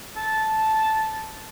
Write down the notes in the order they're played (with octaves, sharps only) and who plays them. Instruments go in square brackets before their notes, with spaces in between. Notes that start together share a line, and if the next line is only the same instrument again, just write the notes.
[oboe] A5